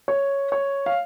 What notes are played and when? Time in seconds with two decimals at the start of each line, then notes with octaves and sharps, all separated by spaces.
0.08 C#5
0.52 C#5
0.86 F5